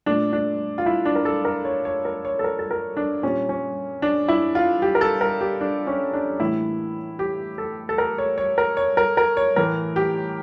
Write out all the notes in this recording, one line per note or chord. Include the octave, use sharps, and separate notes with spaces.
A#2 A3 D4
D4
F4
E4
D4
A#4
A4
A#4
C#5
C#5
A#4
C#5
A4
A#4
A4
A#4
D4
A#2 G3 A#3 C#4
C#4
D4
E4
F4
G4
A#4
A4
A#4
G4
D4
C#4
D4
A2 E3 G3 A#3 E4
G4
A4
A4
A#4
C#5
C#5
A#4
C#5
A#4
A#4
C#5
A2 E3 A3 A#4
G4